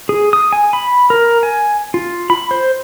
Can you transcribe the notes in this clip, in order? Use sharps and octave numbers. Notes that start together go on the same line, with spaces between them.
G#4
D#6
G#5
B5
A#4
G#5
F4
B5
C5